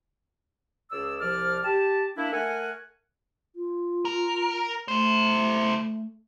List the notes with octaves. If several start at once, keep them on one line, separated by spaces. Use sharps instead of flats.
C#2 G#4 D5 E6
C2 F3 D5 F6
G4 A5
A#3 D4 E4
A3 A#4 F#5 G#5
F4
A#4
A3 E4 C5